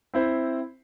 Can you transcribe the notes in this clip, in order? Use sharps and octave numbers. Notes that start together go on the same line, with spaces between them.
C4 E4 C5